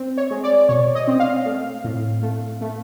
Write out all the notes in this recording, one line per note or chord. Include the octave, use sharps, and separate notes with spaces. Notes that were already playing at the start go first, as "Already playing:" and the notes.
Already playing: C4
C#5
G#3
D5
B2 C#5
D#5
C4
F5
A3
A2
A3
A3